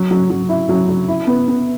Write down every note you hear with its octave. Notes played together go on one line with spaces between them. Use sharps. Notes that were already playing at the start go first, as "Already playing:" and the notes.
Already playing: F#3
F#3
F#3
E4
F#3
F#3
E4
B3
B3